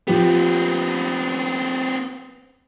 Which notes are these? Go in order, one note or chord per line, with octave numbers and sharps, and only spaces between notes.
F3 B3 C4 G4